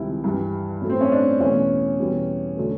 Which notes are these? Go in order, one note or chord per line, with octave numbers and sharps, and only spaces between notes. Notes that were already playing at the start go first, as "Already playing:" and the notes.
Already playing: C#2 C3 D#3 G3 E4
G2 E3 G3
A2 F#3 A3
C4
C#4
D4
E2 B2 F#3 A3 C#4
E2 B2 G3
D3 F#3 A3